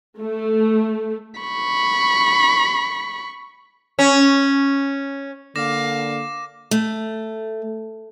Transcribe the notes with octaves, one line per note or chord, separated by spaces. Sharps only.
A3
B5 C#6
C#4
D3 A#3 F5 D6 A#6 E7
A3